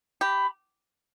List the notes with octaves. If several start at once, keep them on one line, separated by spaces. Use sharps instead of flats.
G4 B5